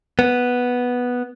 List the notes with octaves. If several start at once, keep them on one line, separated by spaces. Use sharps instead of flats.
B3